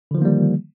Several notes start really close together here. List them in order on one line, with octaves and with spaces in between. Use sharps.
D3 F3 D#3 A#3 G3